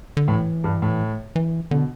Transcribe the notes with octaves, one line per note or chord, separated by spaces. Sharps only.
D3
A2 E3
G2
A2
E3
B2 D3